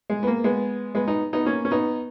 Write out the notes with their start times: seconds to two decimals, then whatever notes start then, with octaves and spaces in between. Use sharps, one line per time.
0.10 G#3
0.23 B3
0.27 A#3
0.44 G#3 B3
0.95 G#3 B3
1.08 B3 D#4
1.33 B3 D#4
1.45 A#3 C#4
1.65 C#4
1.71 B3 D#4